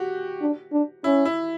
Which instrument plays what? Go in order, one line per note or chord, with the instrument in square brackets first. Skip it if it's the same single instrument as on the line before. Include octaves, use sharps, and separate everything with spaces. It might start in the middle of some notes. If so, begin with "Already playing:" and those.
Already playing: [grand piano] F#4 G4
[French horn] D4
D4
[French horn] C#4 [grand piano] E4
[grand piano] E4